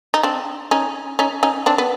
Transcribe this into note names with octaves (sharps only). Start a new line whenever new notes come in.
D#4
C4 D4
C#4 D#4
C#4 D#4
C#4 D#4
C4 D4
B3